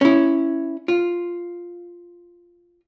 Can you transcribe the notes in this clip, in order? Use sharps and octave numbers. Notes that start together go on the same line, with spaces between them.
C#4 E4
F4